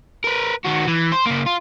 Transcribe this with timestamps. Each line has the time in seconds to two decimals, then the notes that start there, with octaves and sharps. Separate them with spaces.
0.24 A#4 B4
0.65 D#3 F#4
0.87 E3
1.12 C5
1.26 C#3 A#3
1.46 F4